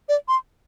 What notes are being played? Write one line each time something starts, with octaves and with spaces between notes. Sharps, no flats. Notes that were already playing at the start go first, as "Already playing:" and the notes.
D5
C6